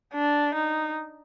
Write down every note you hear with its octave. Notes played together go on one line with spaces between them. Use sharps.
D4
D#4